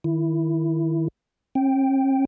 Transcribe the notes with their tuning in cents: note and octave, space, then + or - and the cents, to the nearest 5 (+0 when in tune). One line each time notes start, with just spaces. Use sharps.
D#3 +0 E4 +5
C#4 -45 G5 +0